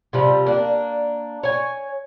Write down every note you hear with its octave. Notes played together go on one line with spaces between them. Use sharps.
C3 F3 G3
A#3 D4
C#5 G#5